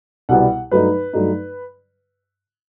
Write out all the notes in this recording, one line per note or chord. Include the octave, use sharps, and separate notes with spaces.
C2 B2 G3 B3 F#5
G2 F#3 A3 D#4 B4
G2 F#3 A3 D#4